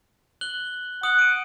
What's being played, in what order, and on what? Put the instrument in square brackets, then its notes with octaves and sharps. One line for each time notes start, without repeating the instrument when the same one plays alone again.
[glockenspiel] F#6 F#7 G7
[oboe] F#5 [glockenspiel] D#6 F#7
[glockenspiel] D7 D#7